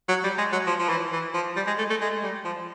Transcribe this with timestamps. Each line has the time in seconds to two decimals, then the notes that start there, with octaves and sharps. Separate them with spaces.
0.08 F#3
0.24 G3
0.38 G#3
0.52 F#3
0.67 F3
0.79 F3
0.89 E3
1.12 E3
1.34 F3
1.56 G3
1.67 G#3
1.78 A3
1.90 A3
2.01 G#3
2.23 G3
2.44 F3